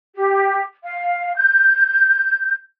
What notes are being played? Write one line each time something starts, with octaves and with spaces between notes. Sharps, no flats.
G4
F5
G6